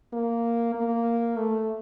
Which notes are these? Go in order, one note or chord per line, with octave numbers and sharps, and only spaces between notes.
A#3
A#3
A3